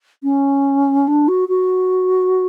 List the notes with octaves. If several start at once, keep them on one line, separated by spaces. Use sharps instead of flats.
C#4
D4
F#4
F#4